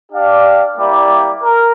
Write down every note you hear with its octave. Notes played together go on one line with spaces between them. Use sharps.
D4 G4 D5 F5
G3 A#3 E4 G4 D5
A#4